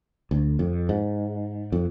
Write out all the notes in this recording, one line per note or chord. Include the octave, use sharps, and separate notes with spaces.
D2
F2
G#2
F2